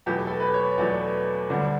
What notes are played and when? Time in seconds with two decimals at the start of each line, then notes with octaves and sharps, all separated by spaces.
0.06 E2 B2 F#3 A3 G4
0.27 A4
0.40 B4
0.54 C#5
0.78 E2 B2 F#3 A3 D5
1.49 D2 D3 G3 D4